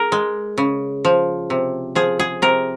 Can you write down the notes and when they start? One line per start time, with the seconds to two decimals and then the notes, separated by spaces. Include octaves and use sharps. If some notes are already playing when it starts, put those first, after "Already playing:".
Already playing: G#4 A#4
0.12 G#3
0.58 C#3
1.05 F3
1.50 C3
1.95 F3 G#4
2.19 G#4
2.42 C3 A#4